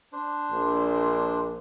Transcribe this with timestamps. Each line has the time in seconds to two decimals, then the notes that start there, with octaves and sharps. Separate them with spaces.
0.13 D4 C5
0.52 A#1